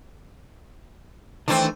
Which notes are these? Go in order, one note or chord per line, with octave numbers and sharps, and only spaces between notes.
D#3 E3 A3 C4 D4